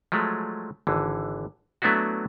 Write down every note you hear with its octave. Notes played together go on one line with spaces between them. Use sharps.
F3 F#3 G#3 A3
G#1 D3 E3
F#3 A3 B3 D4 E4 F#4